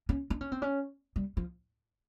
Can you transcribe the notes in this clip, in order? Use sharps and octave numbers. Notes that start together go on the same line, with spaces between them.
C#4
D4
C#4
C4
C#4
G3
F3